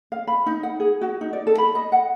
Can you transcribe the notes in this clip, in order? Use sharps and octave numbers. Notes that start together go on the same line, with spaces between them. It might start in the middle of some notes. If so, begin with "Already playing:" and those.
F5
B5
D#4
F#5
G#4
F#4
D#4
D5
A4
B5
D#5
F#5